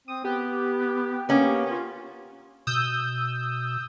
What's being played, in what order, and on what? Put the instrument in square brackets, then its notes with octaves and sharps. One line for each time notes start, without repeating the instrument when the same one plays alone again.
[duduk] C4 [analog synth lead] D#6
[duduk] B3 [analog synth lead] G4
[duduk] A#3 [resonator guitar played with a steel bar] B3 C#4
[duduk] F4
[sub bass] B2 [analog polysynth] D#6 E6 G6